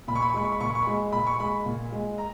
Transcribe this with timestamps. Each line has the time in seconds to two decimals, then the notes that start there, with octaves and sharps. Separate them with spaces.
0.07 A#2 B5
0.15 C#6
0.22 B5
0.30 C#6
0.34 G#3 B5
0.44 C#6
0.52 B5
0.60 A#2 C#6
0.67 B5
0.75 C#6
0.83 B5
0.87 G#3
1.12 A#2 B5
1.27 C#6
1.40 G#3 B5
1.65 A#2
1.92 G#3
2.18 A#5